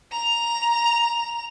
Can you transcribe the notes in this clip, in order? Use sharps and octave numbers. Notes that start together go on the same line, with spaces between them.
A#5 F7